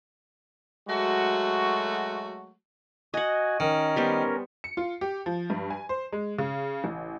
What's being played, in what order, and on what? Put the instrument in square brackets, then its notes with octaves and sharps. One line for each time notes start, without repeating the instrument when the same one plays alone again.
[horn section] F#3 G#3 A3 F#4
[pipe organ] F#4 G#5 [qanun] D#5 F#5
[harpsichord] D#3 [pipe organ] C#4 A#4
[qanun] G3 B3 C5
[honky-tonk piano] C#7
F4
G4
F3
G2
G#5
C5
G#3
C#3
A1